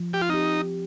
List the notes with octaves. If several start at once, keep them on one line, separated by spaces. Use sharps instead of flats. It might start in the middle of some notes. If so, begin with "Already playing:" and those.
Already playing: F3
G4
F4
C4 D#4 G4